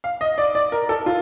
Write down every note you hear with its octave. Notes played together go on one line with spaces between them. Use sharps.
F5
D#5
D5
D5
A#4
A4
F4